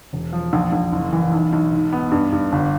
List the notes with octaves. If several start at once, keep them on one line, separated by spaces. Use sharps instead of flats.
E1
F3
A#1
A#1
F#1
E3
B1
B1
G#2
B3
G2
G2
G1